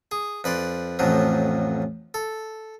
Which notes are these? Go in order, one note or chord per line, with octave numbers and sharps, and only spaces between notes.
G#4
F2 B4 D5 C6
A1 F2 F3 F#3
A4